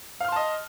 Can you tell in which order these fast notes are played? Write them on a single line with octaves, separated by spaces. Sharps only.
F5 F6 C6 A5 D#5